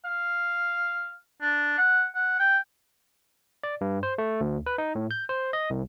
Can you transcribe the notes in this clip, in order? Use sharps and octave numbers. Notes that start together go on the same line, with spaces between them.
F5
D4
F#5
F#5
G5
D5
G2
C5
A3
D2
B4
D#4
A2
G6
C5
D#5
C2